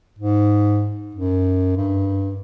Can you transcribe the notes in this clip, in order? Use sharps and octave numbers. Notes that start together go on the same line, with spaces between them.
G#2
F#2
G2